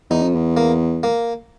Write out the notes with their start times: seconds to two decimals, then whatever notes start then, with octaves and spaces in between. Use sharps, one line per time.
0.10 E2 D#4
0.23 F2
0.35 E2
0.57 A#3
1.03 A#3